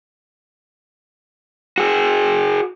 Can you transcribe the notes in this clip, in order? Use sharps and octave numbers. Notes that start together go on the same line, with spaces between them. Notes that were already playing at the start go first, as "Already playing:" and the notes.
F#4 G#4